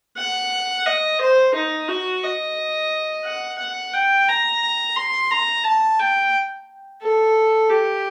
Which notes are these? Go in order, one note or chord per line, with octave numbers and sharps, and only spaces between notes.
F#5
D#5
C5
D#4
F#4
D#5
F#5
F#5
G5
A#5
C6
A#5
A5
G5
A4
G4